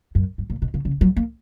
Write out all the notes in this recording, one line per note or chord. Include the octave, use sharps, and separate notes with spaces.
F#2
G2
A#2
B2
C#3
C#3
F#3
A#3